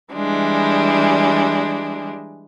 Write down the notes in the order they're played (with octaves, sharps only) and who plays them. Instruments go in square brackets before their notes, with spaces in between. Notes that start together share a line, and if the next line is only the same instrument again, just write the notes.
[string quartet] E3 G3 G#3 D4